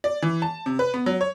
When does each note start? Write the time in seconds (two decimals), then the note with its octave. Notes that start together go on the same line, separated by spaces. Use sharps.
0.04 D5
0.22 E3
0.42 A5
0.66 C3
0.79 B4
0.94 B3
1.06 F#3
1.21 C#5